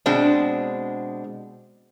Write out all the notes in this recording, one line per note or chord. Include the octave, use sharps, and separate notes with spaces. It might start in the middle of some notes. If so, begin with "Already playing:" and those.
B2 G#3 C4 D4